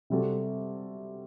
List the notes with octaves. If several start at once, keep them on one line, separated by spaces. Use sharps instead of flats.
C3 G3 C4 F#4 A4